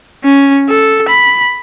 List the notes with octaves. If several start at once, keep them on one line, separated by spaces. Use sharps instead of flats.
C#4
A4
B5